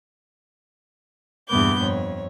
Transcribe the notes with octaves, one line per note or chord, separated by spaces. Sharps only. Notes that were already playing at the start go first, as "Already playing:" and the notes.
E2 G2 A#2 B3 D6 G6
F2 C#5